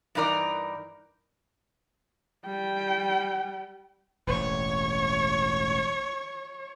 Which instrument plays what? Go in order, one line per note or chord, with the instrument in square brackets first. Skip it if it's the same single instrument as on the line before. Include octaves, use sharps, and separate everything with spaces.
[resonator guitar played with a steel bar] G2 E3 D#4 A#4 D5
[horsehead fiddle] G3 G5
[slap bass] E1 A1 [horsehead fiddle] C#5